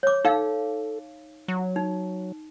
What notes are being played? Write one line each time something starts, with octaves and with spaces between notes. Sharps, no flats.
C#5 D6
D#4 A4 F5
F#3
D#4